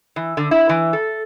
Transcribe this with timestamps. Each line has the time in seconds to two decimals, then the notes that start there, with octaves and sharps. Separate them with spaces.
0.16 E3
0.37 D3
0.51 E4
0.69 E3
0.93 A4